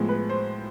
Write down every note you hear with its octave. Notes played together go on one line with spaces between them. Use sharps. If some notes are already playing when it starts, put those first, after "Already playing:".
Already playing: A2 F3 G#3 B3
B4
C5